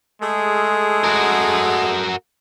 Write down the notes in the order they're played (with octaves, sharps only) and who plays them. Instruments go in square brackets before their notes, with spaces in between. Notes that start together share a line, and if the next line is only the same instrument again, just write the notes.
[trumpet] G#3 [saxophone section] A3 G#4 A4
[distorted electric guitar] F#4 A#4